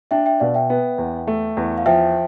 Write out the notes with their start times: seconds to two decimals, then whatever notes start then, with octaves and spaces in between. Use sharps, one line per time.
0.11 D4 E5 G5
0.26 E5 G5
0.40 B2 D5 F5
0.54 E5 G5
0.70 B3
0.98 E2
1.27 A3
1.57 E2
1.78 F5
1.86 F3 E5 G5